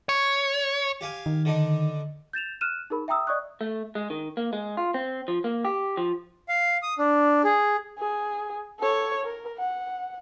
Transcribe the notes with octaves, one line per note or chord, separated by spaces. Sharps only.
C#5
G4 F5 G#5
D#3
D3 D4 D#4
G6 A6 E7 F7
F6 F#6 D#7 E7
D#4 G#4 A#4 B5
E5 G5 A#5 D#6 E6
D5 D#5 C#6 D#6 F#6
A3
G#3
D#3
A#3
G#3
F4
C4
F3
A#3
G4
F3
F5
D#6
D4
G#4
G#4
A4 C#5
A#4
F#5